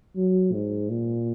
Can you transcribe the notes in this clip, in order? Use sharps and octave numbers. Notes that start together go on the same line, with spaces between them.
F#3
G#2
A#2